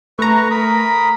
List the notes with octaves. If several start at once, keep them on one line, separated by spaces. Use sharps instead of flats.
A3 B4 A#5 C#6
A#4 B5 D#6